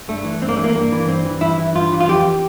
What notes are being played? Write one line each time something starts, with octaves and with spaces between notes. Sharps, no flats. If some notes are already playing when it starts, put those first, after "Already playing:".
G2 A3
E3
G2 C4
A#3
E3 A3
A#3
G2 A#3
E3
G2 C4
E3
G2 E4
E3
G2 F4
E3
F4
F2 G4